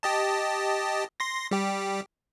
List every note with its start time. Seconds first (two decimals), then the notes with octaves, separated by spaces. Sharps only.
0.03 G4 D#5 A5
1.20 C6 A#6
1.51 G3 G4